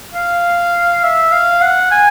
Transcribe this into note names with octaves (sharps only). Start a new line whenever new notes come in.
F5
E5
F5
F#5
G#5